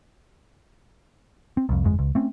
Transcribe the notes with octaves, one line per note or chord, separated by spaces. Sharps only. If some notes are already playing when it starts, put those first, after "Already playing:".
C4
C2 F2
G1 F2 G#3
C#2
A3 C4 C#4